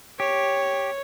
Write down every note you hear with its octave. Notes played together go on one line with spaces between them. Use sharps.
G4 C#5